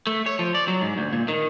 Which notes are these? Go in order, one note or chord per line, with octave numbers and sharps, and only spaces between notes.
A3
C#5
F3
D5
F#3
G#2
D2
A#2
D#3